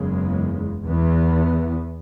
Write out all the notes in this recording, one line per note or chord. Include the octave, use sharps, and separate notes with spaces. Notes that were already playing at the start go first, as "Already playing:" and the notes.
Already playing: F#1 E2 C#3 G#3
E2 E3 B3